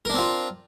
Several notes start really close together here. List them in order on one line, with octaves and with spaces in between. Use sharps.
A#4 D4 C4 F4